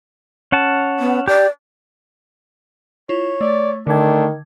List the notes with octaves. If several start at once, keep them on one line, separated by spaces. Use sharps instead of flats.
C#4 F#5 A5
B3
G4 D5
E4 F4 C#5
A3 D5
D3 D#3 A3 D4 G#6